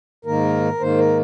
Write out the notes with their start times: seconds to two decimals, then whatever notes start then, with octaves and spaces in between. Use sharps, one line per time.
0.25 G#2 D#3 A#3 A#4
0.80 G#2 D#3 A#3 C5
0.98 A#4